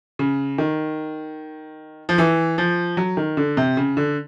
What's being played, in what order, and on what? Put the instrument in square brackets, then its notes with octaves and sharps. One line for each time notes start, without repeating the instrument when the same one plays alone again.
[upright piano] C#3
D#3
F3
E3
F3
F#3
D#3
D3
C3
C#3
D3